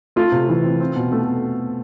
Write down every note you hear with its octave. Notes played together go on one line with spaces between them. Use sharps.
A3 F4
C3
E3
C4
C4
B2
A3